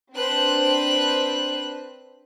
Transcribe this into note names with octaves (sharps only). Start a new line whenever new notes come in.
C4 D4 B4 C5 F#6